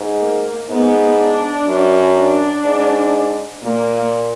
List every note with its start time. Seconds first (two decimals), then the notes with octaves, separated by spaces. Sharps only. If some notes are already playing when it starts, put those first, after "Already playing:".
Already playing: G#2
0.20 A#3
0.69 G#2 B3
1.19 D4
1.67 F#2
2.16 D4
2.65 G#2
3.62 A#2 A#3